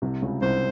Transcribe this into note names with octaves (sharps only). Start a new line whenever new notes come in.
C2 C3
C#2 C#3
C2 C3 C5